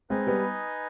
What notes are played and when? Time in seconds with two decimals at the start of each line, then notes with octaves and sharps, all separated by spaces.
0.10 G#3 C4 D#4 B4 D#5 G#5
0.27 G3 B3